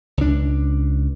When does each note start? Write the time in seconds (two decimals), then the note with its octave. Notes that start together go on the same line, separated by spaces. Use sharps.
0.17 C#2 D4